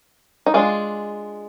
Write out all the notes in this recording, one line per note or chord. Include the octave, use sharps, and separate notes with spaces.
D#4
G#3 D4 F4